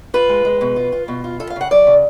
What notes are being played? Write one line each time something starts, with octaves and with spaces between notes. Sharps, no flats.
F4 B4
G#3
G#3
B2
F4
F4
B2
F4
F4 A4
F5
C#3 F#5
F#3 D5
C#3